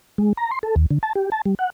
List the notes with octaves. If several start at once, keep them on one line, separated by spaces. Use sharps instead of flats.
G#3
A#5
C6
A4
D#2
D3
A5
G4
A5
G3
F#5